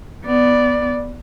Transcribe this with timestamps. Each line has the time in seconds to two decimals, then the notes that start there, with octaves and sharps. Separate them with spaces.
0.25 B3 D5